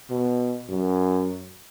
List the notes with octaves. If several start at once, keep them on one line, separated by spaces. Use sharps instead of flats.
B2
F#2